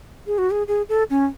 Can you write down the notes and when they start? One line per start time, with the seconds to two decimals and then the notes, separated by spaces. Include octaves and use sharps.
0.27 G#4
0.38 F#4
0.51 G#4
0.68 G#4
0.89 A4
1.10 C#4